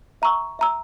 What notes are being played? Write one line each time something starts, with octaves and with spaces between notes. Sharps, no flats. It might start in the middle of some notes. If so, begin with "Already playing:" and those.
E5 A#5 C#6 E6
E5 A#5 E6